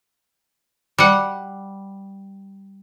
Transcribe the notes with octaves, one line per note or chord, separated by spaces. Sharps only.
G3 F#5